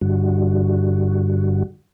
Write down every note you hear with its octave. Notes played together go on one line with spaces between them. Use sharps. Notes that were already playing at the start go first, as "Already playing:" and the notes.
G2 D3 G3 F#4